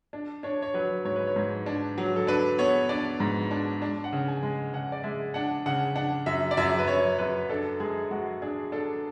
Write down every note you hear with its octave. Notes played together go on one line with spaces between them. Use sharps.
D4
D4 C#5
C#5
F#3 B4
G#2 C#5
B4
C#5
G#2
D4
F#3
A4
D4 B4
B3 C#5
D4 D5
G#2
D4
D4
F#5
C#3
G#5
G#3
C#3 F#5
D5
G#3 E5
D4 F#5
C#3 F#5
D4 F#5
F#2 E5
D5
F#2 E5
B4
F#2 C#5
F#2 B4
D4 A4
G#3 G#4
G#3 F#4
D4 G#4
D4 A4